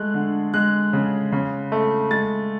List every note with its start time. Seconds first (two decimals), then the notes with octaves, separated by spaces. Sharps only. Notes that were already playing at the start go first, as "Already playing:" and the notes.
Already playing: G#3 A3 F#6
0.14 D3
0.54 G#3 F#6
0.93 C#3
1.32 C#3
1.72 A3
2.11 G#3 A6